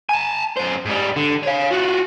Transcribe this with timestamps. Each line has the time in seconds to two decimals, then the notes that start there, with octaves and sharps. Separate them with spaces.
0.09 G#5 A5
0.57 F#2 C5
0.85 G#2 G3
1.16 D3
1.43 C#5 F5
1.71 F4 F#4